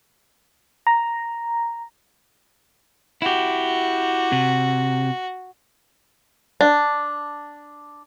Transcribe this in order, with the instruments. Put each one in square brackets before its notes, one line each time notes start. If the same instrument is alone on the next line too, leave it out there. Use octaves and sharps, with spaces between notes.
[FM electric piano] A#5
[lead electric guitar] E4 G4 [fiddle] F#4
[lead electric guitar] C3
[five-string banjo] D4